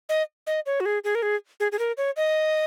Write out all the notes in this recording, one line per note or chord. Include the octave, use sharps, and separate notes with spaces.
D#5
D#5
C#5
F#4
G#4
G#4
A#4
G#4
G#4
G#4
A#4
C#5
D#5